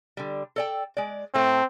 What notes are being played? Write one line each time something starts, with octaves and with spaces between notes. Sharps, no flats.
D3 G3
A4 D5 G5
G#3 D5
A2 A3 C4